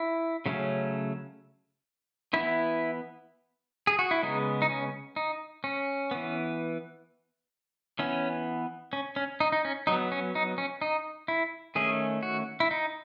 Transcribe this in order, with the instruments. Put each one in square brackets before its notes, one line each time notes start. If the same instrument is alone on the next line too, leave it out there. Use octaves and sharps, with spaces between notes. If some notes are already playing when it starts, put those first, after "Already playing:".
Already playing: [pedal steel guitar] E4
C#3 F#3 A3 C#4
E3 B3 E4
G#4
F#4
E4
C#3 G#3 B3 D#4
D#4
C#4
D#4
C#4
E3 B3
E3 B3 C#4
C#4
C#4
D#4
D#4
C#4
F#3 B3 D#4
C#4
D#4
C#4
D#4
E4
D#3 A3 C#4 G#4
F#4
E4
D#4